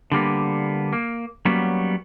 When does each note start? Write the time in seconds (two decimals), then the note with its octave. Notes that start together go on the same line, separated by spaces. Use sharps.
0.12 D3 G3 A#3 B3
0.93 A#3
1.45 F#3 G3 A#3 B3 C#4